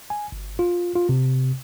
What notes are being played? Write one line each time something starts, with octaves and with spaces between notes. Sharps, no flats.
G#5
G1
F4
F4
C3